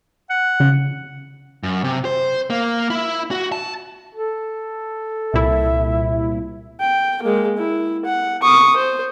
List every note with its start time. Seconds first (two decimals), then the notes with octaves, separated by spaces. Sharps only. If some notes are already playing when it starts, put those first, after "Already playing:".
0.30 F#5
0.60 C#3
1.63 F#2
1.84 C3
2.05 C5
2.50 A#3
2.90 E4
3.31 F#4
3.52 A5
4.15 A4
5.34 C2 A#2 E4 E5
6.81 G5
7.23 G#3 A#3
7.58 E4
8.06 F#5
8.43 C#6 D#6
8.76 C5